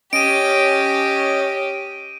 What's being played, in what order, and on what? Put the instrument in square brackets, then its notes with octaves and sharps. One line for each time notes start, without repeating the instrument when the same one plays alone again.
[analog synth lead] C#4 [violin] G4 [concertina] D#5 [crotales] D7 D#7